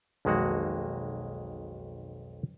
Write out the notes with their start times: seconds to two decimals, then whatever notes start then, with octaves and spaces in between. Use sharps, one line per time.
0.25 B1 F2 D#3 G#3 A#3 F#4